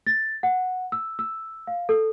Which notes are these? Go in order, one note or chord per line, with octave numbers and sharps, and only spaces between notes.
A6
F#5
E6
E6
F5
A4